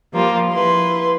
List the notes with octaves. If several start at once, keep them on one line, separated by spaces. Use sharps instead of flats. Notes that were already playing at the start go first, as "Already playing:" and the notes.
F3 G3 A#3 F4
E4 B4 C6